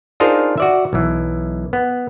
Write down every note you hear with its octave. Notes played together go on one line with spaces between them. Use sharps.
D4 D#4 F4 G#4 A#4 C5
F#4 D5 E5
B1 E3
B3